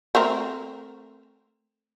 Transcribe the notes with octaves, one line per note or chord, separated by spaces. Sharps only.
A3 C4 A#4